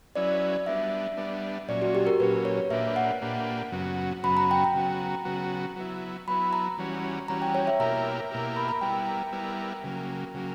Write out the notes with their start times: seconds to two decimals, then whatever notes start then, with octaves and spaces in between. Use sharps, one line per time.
0.16 F#3 C#4 E4 B4 D5
0.66 G3 B3 D4 E5
1.17 G3 B3 D4
1.69 A#2 F#3 C#4 D5
1.82 F#4
1.95 G4
2.07 A#4
2.20 A#2 F#3 C#4 B4
2.45 C#5
2.70 A#2 A#3 D4 G4 B4 E5
2.96 F#5
3.21 A#2 A#3 D4 G4 B4
3.72 F#2 C#3 F#3 B3 F#4
4.23 F#2 C#3 F#3 B3 F#4 B5
4.37 A#5
4.51 G5
4.64 A#5
4.74 C#3 F#3 B3 F#4
5.25 C#3 F#3 B3 F#4
5.76 F#3 B3 E4
6.28 F#3 B3 E4 B5
6.53 A#5
6.78 E3 G3 C#4 F#4
7.28 E3 G3 C#4 F#4 A#5
7.42 G5
7.55 C#5
7.67 E5
7.79 B2 A#3 E4 G4 A#4 A#5
8.31 B2 A#3 E4 G4 A#4
8.56 B5
8.69 A#5
8.81 G3 B3 E4 A#4 G5
9.32 G3 B3 E4 A#4
9.84 C#3 F#3 A#3
10.34 C#3 F#3 A#3